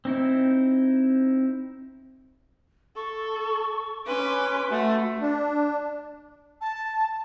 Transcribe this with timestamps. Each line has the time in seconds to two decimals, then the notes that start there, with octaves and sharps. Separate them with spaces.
0.05 C4 D#4 E4
2.96 A4 C#6
4.07 C#4 B4 C6 D6
4.71 A3 F#4
5.21 D4
6.61 A5